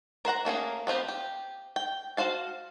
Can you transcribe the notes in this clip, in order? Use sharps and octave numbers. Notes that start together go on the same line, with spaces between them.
A#4 C5 F#5 A#5
A3 A#3 C#4 G#4
B3 C4 F4 G4
G4
G5
F#4 C5 F5 A5